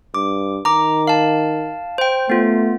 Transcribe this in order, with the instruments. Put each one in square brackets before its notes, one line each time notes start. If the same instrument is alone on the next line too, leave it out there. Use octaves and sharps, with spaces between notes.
[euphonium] G2 [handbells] D6
[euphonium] D#3 [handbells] A#5 D6
[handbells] F5 A5
C5 G5
[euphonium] A3 [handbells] B3 F4